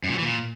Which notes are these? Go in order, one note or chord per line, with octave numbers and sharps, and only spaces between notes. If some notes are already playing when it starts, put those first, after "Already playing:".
F#2
A#2
F#3
E3
A#2